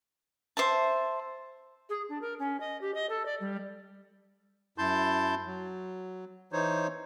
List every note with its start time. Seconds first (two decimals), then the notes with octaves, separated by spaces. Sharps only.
0.57 C5 E5 A5
1.90 G#4
2.09 D4
2.21 A#4
2.39 C#4
2.60 D#5
2.81 G4
2.94 D#5
3.10 A4
3.26 D5
3.40 G3
4.78 F#2 E4 A5 C6 G6
5.46 F#3
6.53 E3 D#4 C5 C#5